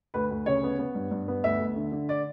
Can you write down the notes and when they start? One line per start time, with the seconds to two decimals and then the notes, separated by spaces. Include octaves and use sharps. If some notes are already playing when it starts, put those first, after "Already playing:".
0.14 D2 B4
0.30 D2
0.46 C#3 C#5
0.63 B3
0.79 B3
0.95 G2
1.11 G2
1.28 B3
1.44 D2 E5
1.59 D2
1.76 D3
1.92 D3
2.09 D5